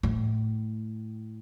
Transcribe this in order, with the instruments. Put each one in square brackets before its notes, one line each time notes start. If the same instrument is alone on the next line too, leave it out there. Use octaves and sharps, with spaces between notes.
[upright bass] A2